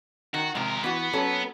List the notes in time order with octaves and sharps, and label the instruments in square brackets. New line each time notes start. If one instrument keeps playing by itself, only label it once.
[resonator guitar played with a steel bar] D#3 [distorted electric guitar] F#4
[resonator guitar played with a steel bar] C3 F3 [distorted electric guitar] G#3 A#4
[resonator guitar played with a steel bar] E3 F#4 [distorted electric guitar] B3 B4
[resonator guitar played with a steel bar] F#3 C#4 A4